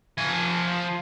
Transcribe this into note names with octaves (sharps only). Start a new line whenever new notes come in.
F3 G#5